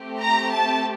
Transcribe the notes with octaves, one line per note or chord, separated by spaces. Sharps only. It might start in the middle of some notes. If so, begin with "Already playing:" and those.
Already playing: A3 C4 G4
A#5
A5